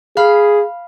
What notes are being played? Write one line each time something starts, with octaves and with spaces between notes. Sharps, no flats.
G#4 F5 B5